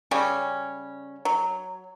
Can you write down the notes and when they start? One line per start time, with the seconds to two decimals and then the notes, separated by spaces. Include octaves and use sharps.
0.11 C#3 G3 C#4
1.25 F#3